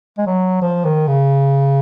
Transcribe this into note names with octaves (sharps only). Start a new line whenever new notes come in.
G#3
F#3
F3
D#3
C#3